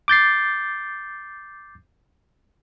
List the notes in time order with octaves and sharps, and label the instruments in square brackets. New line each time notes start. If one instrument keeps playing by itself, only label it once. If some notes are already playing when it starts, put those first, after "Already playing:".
[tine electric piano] D6 G6 A6 C7